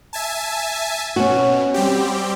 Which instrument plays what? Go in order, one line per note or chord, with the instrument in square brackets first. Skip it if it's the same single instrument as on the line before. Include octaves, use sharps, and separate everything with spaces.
[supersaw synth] E5 G#5 A5
[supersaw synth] B2 [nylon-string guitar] C#4 F#4
[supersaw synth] G3 C4 G4